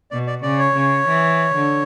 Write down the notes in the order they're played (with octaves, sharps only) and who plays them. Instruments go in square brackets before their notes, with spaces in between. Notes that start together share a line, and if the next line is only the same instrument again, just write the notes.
[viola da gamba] B2 [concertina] D5
[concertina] D5
[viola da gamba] C#3 [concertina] D5
[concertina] C#5
[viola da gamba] C#3
E3
D3